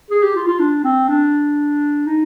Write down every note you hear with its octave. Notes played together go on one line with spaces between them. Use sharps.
G#4
G4
F4
F4
D4
C4
D4
D#4